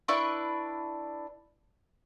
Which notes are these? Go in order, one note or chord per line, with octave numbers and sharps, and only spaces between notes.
D4 E4 B4 C#6